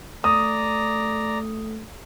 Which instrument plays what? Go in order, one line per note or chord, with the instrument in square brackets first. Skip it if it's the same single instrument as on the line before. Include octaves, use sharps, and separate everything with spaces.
[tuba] A3 [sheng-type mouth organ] D5 A#5 [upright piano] D#6